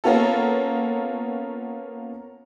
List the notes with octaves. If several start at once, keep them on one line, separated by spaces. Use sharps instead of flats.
A#3 B3 C#4 F4 A4